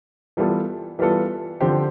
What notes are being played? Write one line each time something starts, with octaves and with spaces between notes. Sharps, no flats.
E3 G3 B3 F4 A4
E3 G3 B3 F4 A4
D3 F3 C4 G4 C5